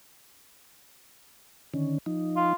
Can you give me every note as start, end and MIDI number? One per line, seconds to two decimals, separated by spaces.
1.74 1.98 50
1.74 1.98 51
1.74 1.98 61
2.06 2.53 53
2.06 2.53 63
2.36 2.54 65